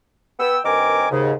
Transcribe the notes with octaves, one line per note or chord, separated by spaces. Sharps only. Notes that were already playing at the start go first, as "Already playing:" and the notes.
B3 G5 E6
G2 D#3 C4 A#4 G#5 D6
D#2 G#2 C#3